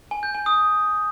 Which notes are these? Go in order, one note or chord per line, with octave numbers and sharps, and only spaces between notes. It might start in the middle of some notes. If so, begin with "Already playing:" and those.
G#5
G6
G#5
D#6